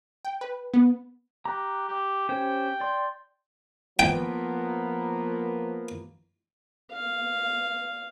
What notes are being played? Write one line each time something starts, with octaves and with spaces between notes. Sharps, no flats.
G5
B4
B3
G4 A#5 F#6
G4
C#4 G4 C5 G5
D5 C6
F3 A#3 B3 G5
F5